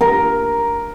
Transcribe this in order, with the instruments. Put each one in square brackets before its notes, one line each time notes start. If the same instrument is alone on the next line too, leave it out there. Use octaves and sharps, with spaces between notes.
[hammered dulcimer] A#4